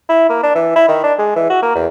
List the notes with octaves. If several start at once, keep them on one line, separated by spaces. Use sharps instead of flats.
E4
A#3
D4
E3
E4
D#3
D4
G#3
E3
F#4
A#3
E2